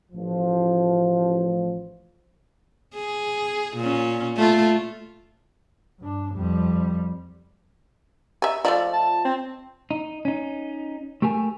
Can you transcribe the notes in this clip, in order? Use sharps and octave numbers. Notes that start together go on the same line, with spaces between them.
A1 F3
G#4
A#2 C#4
A3 F4
G2 D4
F2 G3
G4 D#5 E5 G#5 A#5
F3 A3 F4 D5 D#5
A5
C4
D#4
C#4 D#4
A3 G4 A#4 G#5